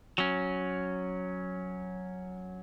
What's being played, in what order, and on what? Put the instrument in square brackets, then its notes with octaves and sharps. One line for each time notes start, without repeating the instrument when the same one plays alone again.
[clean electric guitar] F#3 C#4